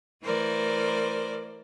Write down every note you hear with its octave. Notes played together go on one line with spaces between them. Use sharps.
E3 A3 A#4 C5 D5